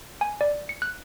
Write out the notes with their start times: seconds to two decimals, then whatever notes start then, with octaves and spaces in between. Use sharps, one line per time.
0.21 G#5
0.41 D5
0.69 C#7
0.82 F#6